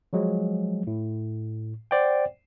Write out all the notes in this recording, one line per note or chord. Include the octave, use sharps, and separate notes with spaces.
F3 F#3 G#3
A2
C5 D5 F#5 G5